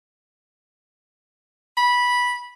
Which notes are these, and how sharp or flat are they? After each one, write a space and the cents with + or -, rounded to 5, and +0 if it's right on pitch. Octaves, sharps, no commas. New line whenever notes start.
B5 -15